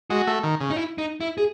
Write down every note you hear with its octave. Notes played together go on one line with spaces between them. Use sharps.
G#3 F#4
A3
D#3
C#3
D#4
E4
D#4
E4
G#4